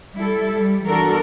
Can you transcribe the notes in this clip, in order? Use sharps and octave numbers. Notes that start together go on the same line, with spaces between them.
G3 E4 A4
G3
E2 E3 D4 F#4 A4 A#4